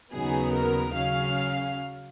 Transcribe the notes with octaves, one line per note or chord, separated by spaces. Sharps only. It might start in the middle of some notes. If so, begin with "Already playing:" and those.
D#2 C#3 F#3 B3 D#4 G#4
A#4
C#3 F#3 C#4 F5